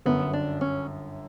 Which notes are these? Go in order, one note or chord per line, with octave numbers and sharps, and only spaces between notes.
G1 F#2 D3 B3
D4
C#4